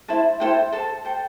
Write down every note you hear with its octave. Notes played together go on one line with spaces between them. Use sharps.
E4 C5 A5
E4 A4 C5 G5
A4 C5 A5
A4 C5 G5